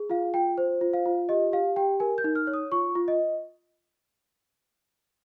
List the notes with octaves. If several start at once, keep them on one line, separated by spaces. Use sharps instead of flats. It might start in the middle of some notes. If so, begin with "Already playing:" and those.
Already playing: G#4
F4 F5
F4 G5
C5
F4
F5
F4
G4 D#5
G4 F5
G4 G5
A#4 G#5
G6
D#4
F6
C#5
D#6
F4 C#6
F4
D#5